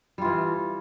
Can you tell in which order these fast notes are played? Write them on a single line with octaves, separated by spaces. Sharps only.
G3 F4 E3